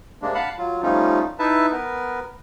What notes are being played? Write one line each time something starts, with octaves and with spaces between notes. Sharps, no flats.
C3 G#3 A#3 D4
F5 F#5 A5 B5
F#3 F4
F3 G3 A3 C#4 D#4 F4
D#4 E4 B4 E5 A5
B3 A#4 B4